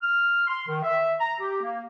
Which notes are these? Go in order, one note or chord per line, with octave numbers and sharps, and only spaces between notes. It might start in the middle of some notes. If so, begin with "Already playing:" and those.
F6
C6
D#3
E5
A#5
G4
A#3